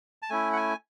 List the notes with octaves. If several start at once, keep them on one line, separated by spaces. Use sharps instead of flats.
A5
A3 C#4 E4 G#5
F#5
G#5